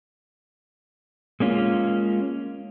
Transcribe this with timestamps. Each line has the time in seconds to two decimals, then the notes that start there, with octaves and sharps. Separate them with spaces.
1.40 G#3 A#3 C#4 F4